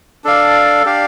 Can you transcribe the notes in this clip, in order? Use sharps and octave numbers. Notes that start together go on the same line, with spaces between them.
D4 A4 D5 F5
D4 G4 D5 F5